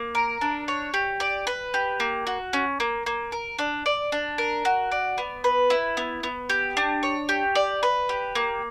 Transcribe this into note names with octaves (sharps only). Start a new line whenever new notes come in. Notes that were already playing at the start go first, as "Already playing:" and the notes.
Already playing: A#3
A#4
D4
C#5
G4
D5
B4
G4
A#3
F#4
C#4
A#3
A#3
A#4
D4
D5
D4
A#4
F#4
D5
B3
B4
E4
B3
B3
G4
D4
C#5
G4
D5
B4
G4
A#3